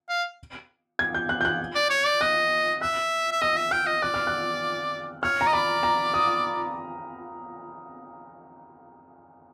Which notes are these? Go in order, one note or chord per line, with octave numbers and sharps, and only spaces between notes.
F5
G#6
G6
F#6
G6
F#6
D5
C#5
D5
D#5 F#6
E5 F#6
E5
D#5 E6
E5
G5 F6
D#5
D5 F#6
F6
F#6
C#5 F6
A#5
D#5
D5 B5
A#5
D#6